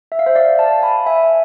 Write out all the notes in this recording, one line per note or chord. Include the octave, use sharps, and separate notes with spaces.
E5
F5
C5 E5
D5 F5
F5 A5
G#5 B5
E5 G#5